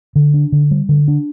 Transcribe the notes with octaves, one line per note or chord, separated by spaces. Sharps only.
D3
D4
D3
G3
D3
D4